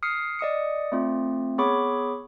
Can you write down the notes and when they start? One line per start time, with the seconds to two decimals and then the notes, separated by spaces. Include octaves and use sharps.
0.03 D#6 F6 C7 C#7
0.39 D5 D#5 D#6 C#7
0.92 A3 C4 F4
1.58 B3 G#4 C#5 B5 C#6 D6